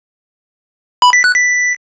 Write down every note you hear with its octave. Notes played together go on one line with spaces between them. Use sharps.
B5
B6
F#6
B6